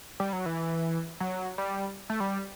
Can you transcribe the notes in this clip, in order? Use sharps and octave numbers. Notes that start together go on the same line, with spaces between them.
G3
F#3
E3
F#3
G3
A3
G3